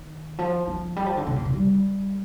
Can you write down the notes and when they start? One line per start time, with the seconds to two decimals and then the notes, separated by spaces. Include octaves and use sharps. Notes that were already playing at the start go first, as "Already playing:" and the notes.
Already playing: D#3
0.38 F3
0.68 F3
0.96 G3
1.06 F3
1.17 D3
1.27 C3
1.36 A#2
1.45 C3
1.55 G3